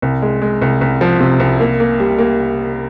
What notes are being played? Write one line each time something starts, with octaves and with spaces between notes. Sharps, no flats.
C2
G#3
G#3
C2
C2
F3
C3
C2
A#3
A#3
G3
A#3